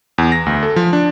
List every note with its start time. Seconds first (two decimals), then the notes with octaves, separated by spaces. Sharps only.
0.18 E2
0.32 A#6
0.46 D2
0.63 A4
0.76 F3
0.93 D4